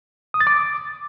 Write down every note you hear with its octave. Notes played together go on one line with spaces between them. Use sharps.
D#6
A6
D6